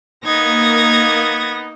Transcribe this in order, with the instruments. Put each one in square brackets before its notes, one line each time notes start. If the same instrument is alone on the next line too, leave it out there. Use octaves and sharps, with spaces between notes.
[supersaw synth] A#3 [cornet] B3 [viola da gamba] D#4 [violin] G#6 A#6